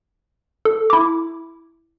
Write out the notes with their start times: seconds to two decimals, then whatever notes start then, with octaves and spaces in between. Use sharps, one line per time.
0.65 A4
0.90 E4 D6